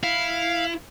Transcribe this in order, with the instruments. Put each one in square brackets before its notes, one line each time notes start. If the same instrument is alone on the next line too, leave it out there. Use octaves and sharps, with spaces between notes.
[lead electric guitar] E4 [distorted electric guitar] F5